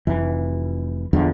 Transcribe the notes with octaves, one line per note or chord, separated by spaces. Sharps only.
F1 E3
A#1 E2 D3 F3